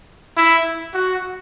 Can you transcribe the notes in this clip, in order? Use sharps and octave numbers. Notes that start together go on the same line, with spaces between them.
E4
F#4